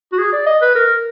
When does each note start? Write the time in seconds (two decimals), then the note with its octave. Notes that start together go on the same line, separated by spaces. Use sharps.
0.12 F#4
0.18 G#4
0.32 D5
0.46 D#5
0.62 B4
0.75 A#4